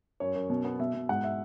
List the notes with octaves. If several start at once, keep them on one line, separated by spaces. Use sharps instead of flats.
F#2 C#5
F#2
B2
B3
B2 E5
B2
G#2 F#5
E5